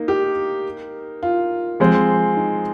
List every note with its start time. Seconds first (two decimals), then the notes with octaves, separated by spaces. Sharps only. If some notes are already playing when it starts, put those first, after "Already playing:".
Already playing: A#3 D#4
0.08 G4
1.23 F4
1.80 F3 G#3 C4
2.37 D#4